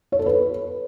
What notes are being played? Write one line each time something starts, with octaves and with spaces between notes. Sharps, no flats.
C#5
A4
B4